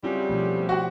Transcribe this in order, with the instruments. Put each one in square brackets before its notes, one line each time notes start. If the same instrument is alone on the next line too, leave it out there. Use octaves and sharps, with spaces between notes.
[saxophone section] C#3 F#3 G3 [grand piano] C4 [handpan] E4 F4
[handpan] B2 F3 A3
[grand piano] F#4 G4 F#5